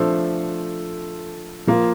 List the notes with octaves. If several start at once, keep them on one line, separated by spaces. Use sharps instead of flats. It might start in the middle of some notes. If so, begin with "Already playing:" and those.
Already playing: F3 A3 D4 A4 C5
F3 A#3 F4